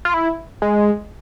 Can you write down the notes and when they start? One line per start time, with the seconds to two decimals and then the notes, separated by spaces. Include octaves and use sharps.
0.05 F4
0.14 E4
0.62 G#3